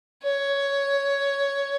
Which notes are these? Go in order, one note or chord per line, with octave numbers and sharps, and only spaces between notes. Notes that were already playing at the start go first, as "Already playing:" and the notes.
C#5